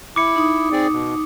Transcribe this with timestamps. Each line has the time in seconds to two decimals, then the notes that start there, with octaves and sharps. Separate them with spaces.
0.16 E4 D6 C#7
0.36 D#4 D#6
0.72 C4 G#4 D5
0.93 B2